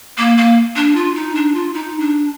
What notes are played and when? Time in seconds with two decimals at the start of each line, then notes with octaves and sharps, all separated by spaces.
0.18 A#3
0.37 A#3
0.76 D4
0.95 F4
1.15 D#4
1.35 D4
1.54 F4
1.74 D#4
2.00 D4